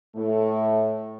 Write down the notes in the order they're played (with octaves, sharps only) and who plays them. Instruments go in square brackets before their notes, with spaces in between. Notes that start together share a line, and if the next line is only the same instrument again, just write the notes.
[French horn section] A2 A3